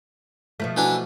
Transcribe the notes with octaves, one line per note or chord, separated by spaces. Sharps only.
B2 F3 A3
E3 D4 F#4